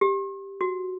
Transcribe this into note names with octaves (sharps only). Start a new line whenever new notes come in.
G4
F#4